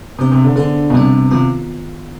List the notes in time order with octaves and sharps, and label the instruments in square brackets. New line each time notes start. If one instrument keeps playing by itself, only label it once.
[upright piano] C3 [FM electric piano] B3 D4 G4 C5
[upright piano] C3
D3
[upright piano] D3 [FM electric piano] B3 D4 G#4 C5
[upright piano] B2
[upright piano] C3 [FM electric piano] G3 B3 D4
[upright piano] C3 [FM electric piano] D#3 B3 F4